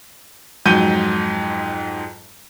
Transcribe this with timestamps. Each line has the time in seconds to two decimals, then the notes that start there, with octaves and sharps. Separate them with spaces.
0.66 F2 G#2 F#3 G6 D#7 G7